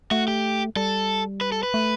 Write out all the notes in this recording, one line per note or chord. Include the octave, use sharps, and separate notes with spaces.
A3 F#4
G4
G3 A4
B4
A4
B4
A3